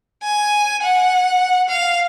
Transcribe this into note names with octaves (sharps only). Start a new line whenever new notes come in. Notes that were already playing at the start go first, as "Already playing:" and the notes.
G#5
F#5
F5